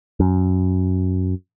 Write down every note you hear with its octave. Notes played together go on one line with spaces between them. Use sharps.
F#2